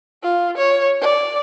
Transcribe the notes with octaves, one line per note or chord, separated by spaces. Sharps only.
F4
C#5
D5